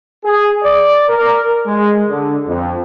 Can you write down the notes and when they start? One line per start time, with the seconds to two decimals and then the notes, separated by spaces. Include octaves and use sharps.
0.25 G#4
0.63 D5
1.09 A#4
1.66 G#3
2.09 D3
2.47 F2